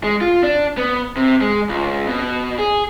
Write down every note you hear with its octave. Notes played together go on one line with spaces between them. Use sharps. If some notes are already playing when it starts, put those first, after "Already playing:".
G#3
F4
D4
B3
C3
G#3
C#2
B2
G#4